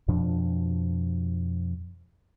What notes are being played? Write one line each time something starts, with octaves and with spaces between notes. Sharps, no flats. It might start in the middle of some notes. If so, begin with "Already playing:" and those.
F2 B2 F3 D4